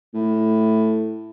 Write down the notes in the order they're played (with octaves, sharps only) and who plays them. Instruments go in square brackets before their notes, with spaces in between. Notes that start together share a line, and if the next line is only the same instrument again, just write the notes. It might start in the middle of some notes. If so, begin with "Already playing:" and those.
[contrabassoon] A2